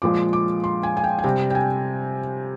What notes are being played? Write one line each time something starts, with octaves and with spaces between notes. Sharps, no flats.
A#2 F3 G#3 D6
D6
C6
G#5
G#5
G5
G#5
C3 G3 G5
G5
G#5